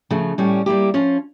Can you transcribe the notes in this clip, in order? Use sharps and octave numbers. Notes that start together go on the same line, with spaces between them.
C#3 F3 A3
A2 G3 C#4
G3 A#3 E4 G4
F3 C#4 F4